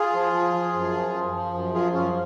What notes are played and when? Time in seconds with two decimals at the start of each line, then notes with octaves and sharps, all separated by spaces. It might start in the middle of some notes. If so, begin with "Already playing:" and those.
Already playing: F4 G#4
0.14 F3
0.33 F3
0.54 F3
0.74 F#2
0.93 F3
1.14 F3
1.34 F3
1.53 F#2
1.74 F3 F4 G#4
1.93 F#2 C#4 F4